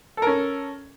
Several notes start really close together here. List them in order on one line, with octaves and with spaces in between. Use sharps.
A4 A#4 C#4